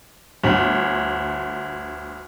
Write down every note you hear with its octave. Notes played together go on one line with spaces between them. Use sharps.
G1 D2